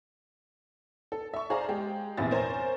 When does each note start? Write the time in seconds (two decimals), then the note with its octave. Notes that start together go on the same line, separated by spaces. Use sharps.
1.12 A4
1.34 E5 C#6
1.50 G#4 C5 D5 F5 A#5
1.69 G#3 G4
2.17 A#1 E2 C3 E4 A6
2.31 A#4 C5 C#5 G#5